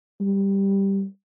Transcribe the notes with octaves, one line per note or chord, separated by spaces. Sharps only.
G3